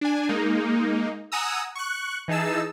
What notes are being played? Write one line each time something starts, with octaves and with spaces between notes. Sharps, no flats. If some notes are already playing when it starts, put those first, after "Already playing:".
D4 G#5
G#3 A#3 D#4
F#5 G#5 A#5 D#6 E6
C#6 F#6
E3 D#4 G#4 A5 E6